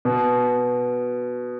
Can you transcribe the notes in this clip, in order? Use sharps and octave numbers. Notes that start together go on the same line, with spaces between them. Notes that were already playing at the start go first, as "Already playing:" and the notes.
B2